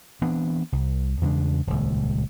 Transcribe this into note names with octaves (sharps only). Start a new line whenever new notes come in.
E3 B3 C4 D4
C2
E2 C#3 G#3 D4
D#1 C#2